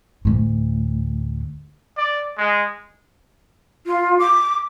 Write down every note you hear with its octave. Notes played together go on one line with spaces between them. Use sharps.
D2 A2
D5
G#3
F4
D6